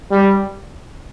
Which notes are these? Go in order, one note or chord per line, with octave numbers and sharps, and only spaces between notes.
G3